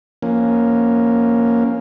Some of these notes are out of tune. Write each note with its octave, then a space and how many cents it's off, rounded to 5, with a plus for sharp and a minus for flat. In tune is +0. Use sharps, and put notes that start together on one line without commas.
F3 -25 A#3 +0 C#4 +0